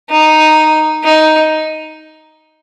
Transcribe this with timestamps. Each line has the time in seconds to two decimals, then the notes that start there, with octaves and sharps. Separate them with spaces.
0.10 D#4
1.04 D#4